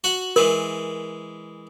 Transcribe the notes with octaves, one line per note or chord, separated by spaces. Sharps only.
F#4 F#5
E3 G#3 A#4 B5